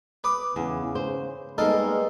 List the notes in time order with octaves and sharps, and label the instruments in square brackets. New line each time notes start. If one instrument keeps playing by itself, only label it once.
[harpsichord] B4 D6 D#6
[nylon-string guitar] E2 [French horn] C#3
[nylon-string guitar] C5
[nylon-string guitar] G3 A#3 B3 [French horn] G#3 [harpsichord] D#4 A4 A#4